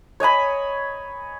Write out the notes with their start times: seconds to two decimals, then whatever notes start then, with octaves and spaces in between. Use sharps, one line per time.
0.20 C#5 D#5 G#5 B5